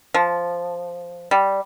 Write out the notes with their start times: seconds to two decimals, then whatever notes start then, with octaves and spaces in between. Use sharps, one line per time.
0.14 F3
1.31 G3